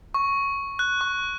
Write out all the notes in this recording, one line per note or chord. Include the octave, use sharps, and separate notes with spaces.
C#6
F#6
C#6